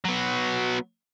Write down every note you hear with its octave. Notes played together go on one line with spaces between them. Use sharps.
F#3 B3